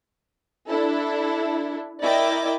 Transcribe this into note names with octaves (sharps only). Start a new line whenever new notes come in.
D4 E4 A4
E4 A#4 D5 D#5 G5 D6